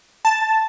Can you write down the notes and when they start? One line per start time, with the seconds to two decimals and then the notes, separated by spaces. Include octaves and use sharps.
0.25 A5